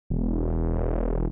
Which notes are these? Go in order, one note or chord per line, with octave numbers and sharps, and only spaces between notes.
E1